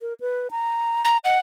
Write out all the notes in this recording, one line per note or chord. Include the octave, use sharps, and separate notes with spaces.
A#4
B4
A#5
A#5
D#5 F#5